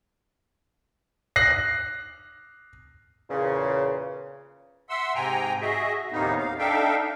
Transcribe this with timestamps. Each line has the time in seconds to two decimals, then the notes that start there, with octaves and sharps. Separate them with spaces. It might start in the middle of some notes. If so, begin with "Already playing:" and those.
1.36 F#6 A#6 C7
3.29 E2 A#2 C#3
4.89 E5 F#5 C6 E6
5.15 G#2 C3 G5 G#5 A#5
5.61 F#4 G#4 D#5 E5
6.12 D#2 A2 C3 A#3 B3 D#4
6.38 F5
6.59 D4 D#4 A4 E5 F5 G5